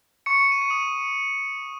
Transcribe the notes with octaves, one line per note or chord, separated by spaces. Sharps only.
C#6 C#7
D#7
C#7
D#6 D#7